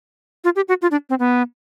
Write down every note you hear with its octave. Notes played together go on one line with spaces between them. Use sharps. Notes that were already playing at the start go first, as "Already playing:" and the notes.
F4
G4
F#4
F4
D4
C4
B3